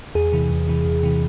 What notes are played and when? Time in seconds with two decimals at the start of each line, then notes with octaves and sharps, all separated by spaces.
0.15 E2 G#4
0.33 C3 E3
0.50 E2
0.68 C3 E3
0.85 E2
1.03 C3 E3